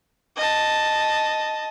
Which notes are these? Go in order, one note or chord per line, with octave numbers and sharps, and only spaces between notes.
D#5 A5